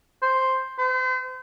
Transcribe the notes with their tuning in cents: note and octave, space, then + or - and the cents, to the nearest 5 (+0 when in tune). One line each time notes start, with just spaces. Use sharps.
C5 +0
C5 -40